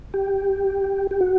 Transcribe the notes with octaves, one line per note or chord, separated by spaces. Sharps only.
G4
G4
F#4